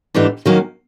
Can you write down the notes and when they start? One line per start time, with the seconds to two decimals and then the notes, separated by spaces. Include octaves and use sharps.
0.14 G#2 E3 A3 D4 G4
0.46 D#3 F#3 A#3 C#4